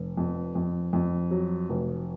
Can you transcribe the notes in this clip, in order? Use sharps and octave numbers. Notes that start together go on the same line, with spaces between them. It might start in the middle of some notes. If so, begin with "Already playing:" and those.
Already playing: F1
F2
F2
F2
F#3
F1